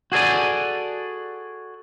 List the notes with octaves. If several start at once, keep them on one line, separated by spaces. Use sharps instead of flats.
F#4 G#4 A4 D5 G#5